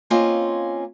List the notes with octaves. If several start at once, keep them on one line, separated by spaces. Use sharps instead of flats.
A#3 C4 C#4 F4 D#5 G#5